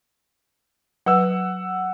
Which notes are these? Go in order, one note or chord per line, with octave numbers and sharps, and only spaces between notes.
F#3 B4 F#5 E6